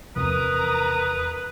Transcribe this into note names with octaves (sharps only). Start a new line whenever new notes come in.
E2 C3 F3 A#4 B4 A#5 D#6